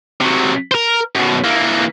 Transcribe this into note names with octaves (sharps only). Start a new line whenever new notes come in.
C3 F#3
A#4 C5
F#2 B2
E3 A#3